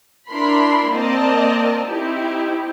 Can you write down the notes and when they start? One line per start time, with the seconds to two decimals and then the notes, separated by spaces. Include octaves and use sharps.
0.30 D4 E4 A#4 B5 C6
0.91 A#3 C4 A#4 D5 D#5 A5
1.87 C4 D#4 E4 G4